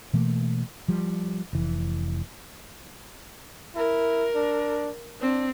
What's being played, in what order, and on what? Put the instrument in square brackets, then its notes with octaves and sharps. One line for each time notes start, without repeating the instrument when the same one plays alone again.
[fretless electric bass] B2 E3 A3 A#3
F3 G3
F1 E3
[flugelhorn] E4 [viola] A#4
[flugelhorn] D4
[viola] C4 [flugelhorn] D4